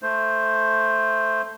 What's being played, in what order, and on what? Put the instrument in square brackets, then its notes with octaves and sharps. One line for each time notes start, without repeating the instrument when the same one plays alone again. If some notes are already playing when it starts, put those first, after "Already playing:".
[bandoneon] A3 C5